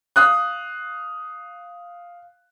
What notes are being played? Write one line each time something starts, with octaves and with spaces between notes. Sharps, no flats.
F5 D#6 F#6